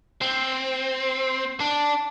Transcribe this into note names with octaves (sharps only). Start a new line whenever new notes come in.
C4
D4